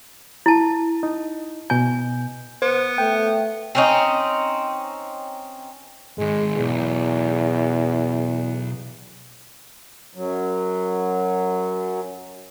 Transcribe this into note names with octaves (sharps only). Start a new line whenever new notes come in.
E4 A5
D#4
B2 G#5 G6
B3 C5
A3 G5
C4 C#4 D#4
G#2 D#3 G#3
B1 E2
F#2 F#3